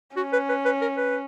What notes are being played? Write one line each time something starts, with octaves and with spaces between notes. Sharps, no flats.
C#4 F#4
B4
B4
B4
A#4
B4